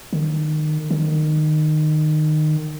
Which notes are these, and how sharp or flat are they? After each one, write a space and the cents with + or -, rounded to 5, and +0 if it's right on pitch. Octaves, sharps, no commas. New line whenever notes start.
D#3 -25
D#3 -20